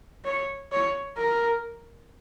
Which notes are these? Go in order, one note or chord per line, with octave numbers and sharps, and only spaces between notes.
C#5
C#5
A#4